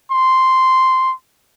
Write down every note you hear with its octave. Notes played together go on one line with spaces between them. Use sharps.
C6